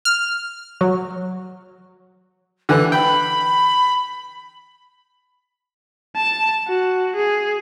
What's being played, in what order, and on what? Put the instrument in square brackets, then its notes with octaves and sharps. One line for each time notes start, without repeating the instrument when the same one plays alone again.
[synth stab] F6
F#3
[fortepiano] D3 E3 [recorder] F#6
[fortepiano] G5 [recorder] B5
[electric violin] A5
F#4
G#4